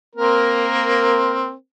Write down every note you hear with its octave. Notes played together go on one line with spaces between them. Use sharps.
A#3 C4 A#4